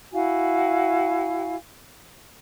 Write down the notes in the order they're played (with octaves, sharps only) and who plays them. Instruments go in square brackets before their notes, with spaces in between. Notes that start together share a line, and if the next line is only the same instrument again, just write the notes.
[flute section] E4 F#4 F5 G#5